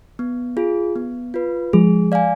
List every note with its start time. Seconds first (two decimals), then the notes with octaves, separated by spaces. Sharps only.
0.19 B3
0.57 F4 G#4
0.96 B3
1.34 F4 B4
1.73 F3 G#3 G#4
2.12 D5 F5 G#5